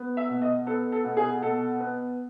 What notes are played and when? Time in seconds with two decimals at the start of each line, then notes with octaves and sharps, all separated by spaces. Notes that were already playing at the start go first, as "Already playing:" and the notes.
Already playing: B3
0.17 E5
0.29 B2
0.42 D#5
0.67 B3 A4
0.92 A4
1.04 B2
1.17 G#4
1.42 B2 A4
1.80 B3